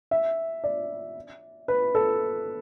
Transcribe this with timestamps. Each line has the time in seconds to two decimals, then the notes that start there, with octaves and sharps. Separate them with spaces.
0.11 E5
0.64 D5
1.68 B4
1.95 A4